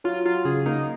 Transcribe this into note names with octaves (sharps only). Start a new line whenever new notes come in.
F#3 F4
F#3 F4
C#3 G#4
A#3 D#4